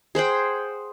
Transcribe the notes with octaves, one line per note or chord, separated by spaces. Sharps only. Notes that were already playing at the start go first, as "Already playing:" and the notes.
G#4 C5 F#5 G5